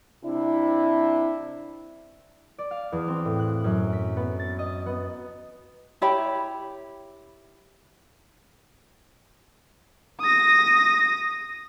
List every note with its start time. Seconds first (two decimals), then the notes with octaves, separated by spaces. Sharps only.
0.25 C3 D4 E4
2.58 D5
2.71 F5
2.92 E2
3.08 C4
3.25 A2
3.39 F#6
3.64 F#2
3.93 B6
4.17 B3
4.39 A6
4.59 D#5
4.86 B3
6.02 E4 G4 C#5 B5
10.21 D#6 A#6